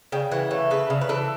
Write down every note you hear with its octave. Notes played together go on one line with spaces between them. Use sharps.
C#3 G5
E3 F#5
A3
C#3 B4
C#3
B4
E3 A4